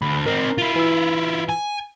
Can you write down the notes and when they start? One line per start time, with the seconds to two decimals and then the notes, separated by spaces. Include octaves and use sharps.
0.02 D2 B5
0.26 C4 D#4 A#4 C7
0.58 E4 F4
0.76 E3 E6
1.50 G#5